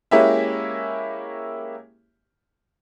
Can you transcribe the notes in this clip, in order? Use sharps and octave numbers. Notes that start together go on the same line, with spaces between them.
G#3 A#3 C#4 E4 G4 E5